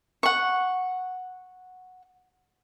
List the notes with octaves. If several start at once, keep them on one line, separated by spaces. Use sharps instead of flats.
F#5 C#6